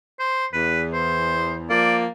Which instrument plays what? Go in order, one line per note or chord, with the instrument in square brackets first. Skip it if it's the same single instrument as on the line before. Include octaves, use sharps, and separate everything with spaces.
[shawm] C5
[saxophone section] E2 [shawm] B4
[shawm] C5
[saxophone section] F3 A#3 [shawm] D5